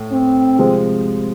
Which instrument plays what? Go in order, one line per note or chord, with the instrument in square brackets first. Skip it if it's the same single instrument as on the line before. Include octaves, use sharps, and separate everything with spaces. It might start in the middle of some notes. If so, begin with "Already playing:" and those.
Already playing: [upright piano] A2
[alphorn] C4
[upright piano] C3 F3 G#3